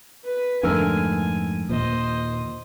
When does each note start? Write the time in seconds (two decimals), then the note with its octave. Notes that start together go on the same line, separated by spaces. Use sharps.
0.24 B4
0.63 F2 G#2 D3 A3 A#4 G#5 E6
1.69 D#2 A#2 C5 D#5